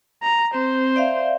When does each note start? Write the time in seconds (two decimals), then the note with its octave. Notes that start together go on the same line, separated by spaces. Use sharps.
0.23 A#5
0.54 C4 C5
0.96 D5 E5 F5